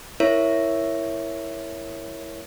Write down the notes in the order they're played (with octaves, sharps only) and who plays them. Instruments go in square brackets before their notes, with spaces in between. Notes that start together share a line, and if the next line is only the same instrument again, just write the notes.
[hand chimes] E4 A#4 C#5 E5